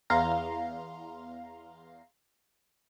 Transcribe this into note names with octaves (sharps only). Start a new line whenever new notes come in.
E2 F5 A#5 C6